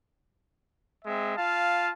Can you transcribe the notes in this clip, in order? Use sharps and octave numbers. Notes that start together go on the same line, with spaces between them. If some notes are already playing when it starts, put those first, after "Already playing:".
G#3 C4 E5
F4 F5 A5